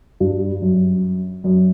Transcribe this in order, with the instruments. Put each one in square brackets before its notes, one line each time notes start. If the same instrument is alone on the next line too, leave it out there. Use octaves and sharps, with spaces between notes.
[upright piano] G2
F#2
F#2